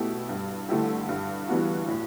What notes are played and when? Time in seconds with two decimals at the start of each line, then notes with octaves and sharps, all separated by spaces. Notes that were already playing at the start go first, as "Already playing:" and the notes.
Already playing: B2 A3 E4 G4
0.29 G2
0.69 D3 A3 E4 G4
1.09 G2
1.48 E3 G3 B3 F#4
1.88 A2